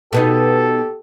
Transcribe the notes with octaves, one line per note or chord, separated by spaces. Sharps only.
B2 B3 D#4 G4 A4